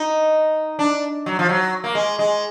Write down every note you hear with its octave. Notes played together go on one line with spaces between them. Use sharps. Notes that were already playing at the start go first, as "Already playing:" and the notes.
Already playing: D#4
D4
F#3
F3
F#3
A#3
G#3
G#3